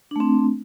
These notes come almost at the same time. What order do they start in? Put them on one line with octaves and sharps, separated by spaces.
D4 A3 C4